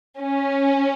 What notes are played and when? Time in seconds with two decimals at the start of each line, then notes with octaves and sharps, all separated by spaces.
0.19 C#4